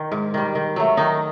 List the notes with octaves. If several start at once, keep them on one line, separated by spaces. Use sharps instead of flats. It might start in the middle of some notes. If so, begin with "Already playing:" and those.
Already playing: D#3
G#2
D#3 G3
D#3
F#3 A3
D#3 D#4